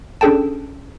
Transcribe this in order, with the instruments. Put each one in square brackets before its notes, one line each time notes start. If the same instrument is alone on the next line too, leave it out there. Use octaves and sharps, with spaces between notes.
[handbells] C#4 D4 G#4 A4 G5 A5